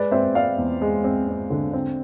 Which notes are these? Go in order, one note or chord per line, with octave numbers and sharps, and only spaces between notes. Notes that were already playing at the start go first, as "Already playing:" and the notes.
Already playing: G#3 B4 D5
C4 C5 E5
C4 D5 F5
E2
G#3
C4
C4
D3
C4